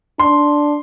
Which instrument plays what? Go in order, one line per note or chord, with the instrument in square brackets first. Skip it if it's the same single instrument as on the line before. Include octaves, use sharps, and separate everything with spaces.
[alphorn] D4 [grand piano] C6